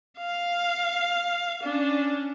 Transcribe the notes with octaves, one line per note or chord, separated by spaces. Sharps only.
F5
C#4 D4